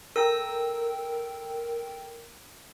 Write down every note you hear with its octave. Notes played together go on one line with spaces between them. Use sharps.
A4 A#4 G5 E6